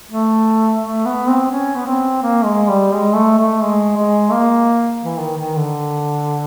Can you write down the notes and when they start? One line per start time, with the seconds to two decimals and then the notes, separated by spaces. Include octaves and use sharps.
0.11 A3
0.82 A3
1.06 B3
1.28 C4
1.51 C#4
1.76 B3
1.86 C4
2.22 A#3
2.45 G#3
2.68 G3
2.93 G#3
3.15 A3
3.38 A3
3.63 G#3
3.97 G#3
4.32 A#3
5.03 E3
5.19 D#3
5.37 D#3
5.56 D3